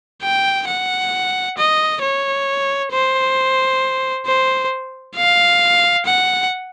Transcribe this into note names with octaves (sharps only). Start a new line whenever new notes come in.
G5
F#5
D#5
C#5
C5
C5
F5
F#5